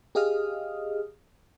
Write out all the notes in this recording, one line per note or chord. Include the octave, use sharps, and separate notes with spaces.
G4 G#4 D#5 F5 D#6 F6